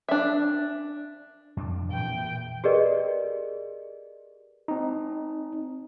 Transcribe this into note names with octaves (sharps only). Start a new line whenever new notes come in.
D4 E5
F2 C4 D4
A#2 E3 G5
G4 G#4 A#4 B4 D5 D#5
C4 D#4